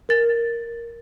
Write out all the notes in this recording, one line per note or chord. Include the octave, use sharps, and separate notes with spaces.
A#4 A6